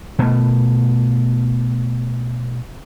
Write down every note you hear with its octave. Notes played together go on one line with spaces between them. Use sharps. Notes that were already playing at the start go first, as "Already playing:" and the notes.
B2 A3